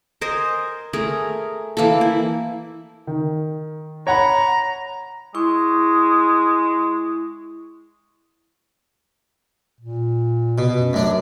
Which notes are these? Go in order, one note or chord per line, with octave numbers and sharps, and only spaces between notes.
A#4 C5 D#5 G#5
A3 G#4 A#4
E3 A#3 E4 A4
E4
D#3
C#5 F#5 A#5 B5
G#3 E4 C#6
A#2
B2
F#2
F#2 A3 D4